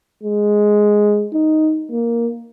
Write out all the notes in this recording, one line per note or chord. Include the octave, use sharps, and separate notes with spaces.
G#3
D#4
A#3